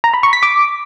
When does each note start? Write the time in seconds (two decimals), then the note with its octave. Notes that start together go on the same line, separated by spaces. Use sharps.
0.04 A#5
0.14 B5
0.23 C#6
0.33 B6
0.43 D6